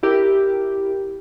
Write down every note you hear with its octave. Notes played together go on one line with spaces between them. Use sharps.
E4 G4 A#4